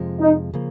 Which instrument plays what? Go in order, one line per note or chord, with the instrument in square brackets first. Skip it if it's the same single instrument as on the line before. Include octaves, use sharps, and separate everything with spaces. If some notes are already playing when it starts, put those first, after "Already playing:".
Already playing: [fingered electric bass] F2 C3 F3 G#3
[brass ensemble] D#4
[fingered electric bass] C#3 F3 A#3